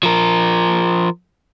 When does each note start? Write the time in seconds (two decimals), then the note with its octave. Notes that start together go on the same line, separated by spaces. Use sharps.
0.03 F3 A#4